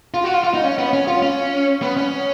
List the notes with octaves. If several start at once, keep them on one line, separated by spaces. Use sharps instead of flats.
F4
F#4
F4
F4
D#4
C#4
B3
C#4
F4
C#4
B3
C#4